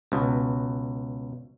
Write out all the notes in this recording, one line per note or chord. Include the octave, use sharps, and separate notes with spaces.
C#2 B2